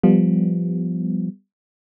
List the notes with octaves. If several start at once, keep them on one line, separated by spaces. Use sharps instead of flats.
F3 G3 B3